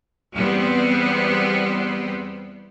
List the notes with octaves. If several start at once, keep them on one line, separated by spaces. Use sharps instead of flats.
E2 G3 B3 C4